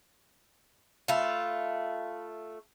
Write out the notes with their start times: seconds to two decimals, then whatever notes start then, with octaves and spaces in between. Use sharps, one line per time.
1.08 A3 F4 E5 F5 B5